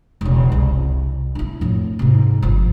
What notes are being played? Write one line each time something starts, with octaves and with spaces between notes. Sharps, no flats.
E1 C#3
C2
D4 E4
F2 A2
G#2 C3
G1 F3